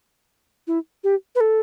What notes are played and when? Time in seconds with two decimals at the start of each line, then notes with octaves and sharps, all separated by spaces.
0.67 E4
1.04 G4
1.35 B4
1.41 A4